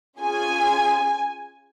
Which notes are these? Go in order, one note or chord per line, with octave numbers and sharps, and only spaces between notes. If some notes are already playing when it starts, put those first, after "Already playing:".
C#4 F4 G#4 G#5